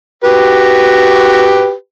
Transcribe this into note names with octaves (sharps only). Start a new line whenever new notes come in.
F#4 G4 B4